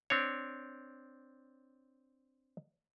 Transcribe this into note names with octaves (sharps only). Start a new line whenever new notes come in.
C4 D4 C#5